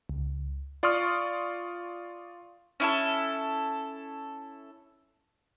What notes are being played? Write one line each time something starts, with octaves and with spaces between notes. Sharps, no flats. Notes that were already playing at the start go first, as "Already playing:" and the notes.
C#2
F4 D5 C6 C#6 D#6 F6
C#4 E4 A4